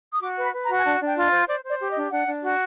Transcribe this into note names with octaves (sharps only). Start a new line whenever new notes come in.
D#6
F#4 D6
B4
B5
B4
A#5
F#4
G#5
D4 A5
D4
G5
F4
D#5
C5
C5 D5
C5 D5
G4
D#5
D4
D4 F#5
D4
F#4